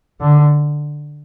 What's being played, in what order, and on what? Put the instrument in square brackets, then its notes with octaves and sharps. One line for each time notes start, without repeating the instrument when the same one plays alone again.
[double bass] D3